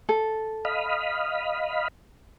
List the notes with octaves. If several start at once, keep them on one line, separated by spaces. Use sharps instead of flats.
A4
D#5 F5 B5